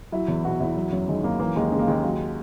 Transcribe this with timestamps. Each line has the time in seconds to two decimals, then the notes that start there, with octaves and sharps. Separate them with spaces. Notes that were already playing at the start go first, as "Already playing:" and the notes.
0.12 F#3 E4
0.28 E2
0.45 B2 F#4
0.60 E2 E4
0.76 F#3
0.93 F#2
1.08 D#3 G#3
1.24 F#2 A#3
1.39 E3 A#3
1.56 D#2 G#3
1.72 C#3 G#3
1.79 A#3
1.87 D#2 G#3
2.03 F#3